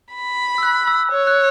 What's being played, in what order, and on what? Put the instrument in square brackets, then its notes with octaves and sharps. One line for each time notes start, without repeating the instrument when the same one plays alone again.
[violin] B5
[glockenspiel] E6
F#6
E6
[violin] C#5
[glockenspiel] F#6